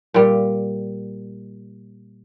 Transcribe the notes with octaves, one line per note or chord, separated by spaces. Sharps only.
A#2 G3